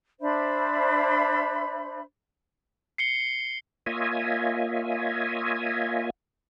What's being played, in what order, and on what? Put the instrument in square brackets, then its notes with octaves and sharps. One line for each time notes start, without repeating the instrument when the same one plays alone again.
[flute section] D4 C5 E5 B5
[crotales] C7 C#7 G7
[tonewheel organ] A#3 F4 C#5 D#5 E5 G#5